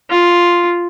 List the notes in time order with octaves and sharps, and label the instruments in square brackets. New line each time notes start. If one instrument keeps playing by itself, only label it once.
[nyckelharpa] F4